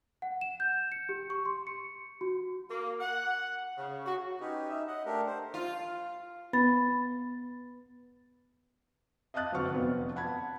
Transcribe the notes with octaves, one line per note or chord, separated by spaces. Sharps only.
F#5
E7
G6
C#7
G4
C#6
C6
C#7
F#4
A#3
F#5
C#3
F#4
C#4 D#4 G4 B4
D#4 E5
D#5 F#5
A3 D4 G4 A#4
C5
F4
B3 B5 A6
D#5 F5 A5 D#6 F#6 A6
G1 F#3 C4 F#5 C#6 F6
F1 B3
F#5 A5 B5 G#6